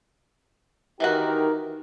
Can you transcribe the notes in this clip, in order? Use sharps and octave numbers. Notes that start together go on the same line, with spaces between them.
D#3 E3 D#4 E4 F#4 G4 A#4